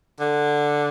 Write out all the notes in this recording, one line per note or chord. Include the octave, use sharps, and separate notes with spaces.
D3